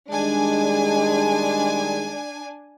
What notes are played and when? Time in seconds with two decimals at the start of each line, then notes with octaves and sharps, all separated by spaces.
0.10 D#3 G3 G#3 D4 G#5